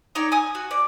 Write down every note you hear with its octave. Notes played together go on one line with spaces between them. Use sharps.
D#4 C#5 D5 G5
G#5 D#6
F#4
D5